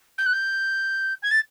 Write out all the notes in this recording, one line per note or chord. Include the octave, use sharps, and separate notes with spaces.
G6
F#6
G6
G#6
A6